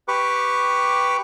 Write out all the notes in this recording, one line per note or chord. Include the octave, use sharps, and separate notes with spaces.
G4 B4 C#6 D6